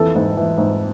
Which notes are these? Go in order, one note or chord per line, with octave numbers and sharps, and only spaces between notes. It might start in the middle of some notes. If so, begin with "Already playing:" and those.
Already playing: F2 E3 A4
G#2
E3
G#2